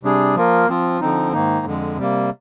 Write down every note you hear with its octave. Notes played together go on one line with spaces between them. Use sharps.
C3 G3 D4 G#4
F3 A#3 F4 A#4
F3 C4 F4
D3 F3 C4 D#4
G#2 D#3 A#3 D#4
F2 D3 G#3
C3 G3 A#3